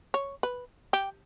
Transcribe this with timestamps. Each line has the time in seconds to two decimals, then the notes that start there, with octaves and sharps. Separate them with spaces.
0.14 C#5
0.43 B4
0.93 G4